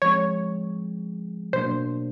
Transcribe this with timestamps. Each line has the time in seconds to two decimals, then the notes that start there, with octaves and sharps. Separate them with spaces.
0.02 F3 G#3 C4 C#5
1.53 B2 F#3 A#3 D4 C5